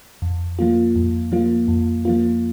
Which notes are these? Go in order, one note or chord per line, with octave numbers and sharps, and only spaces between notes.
F2
F3 A#3 F4
F2
F3 A#3 F4
F2
F3 A#3 F4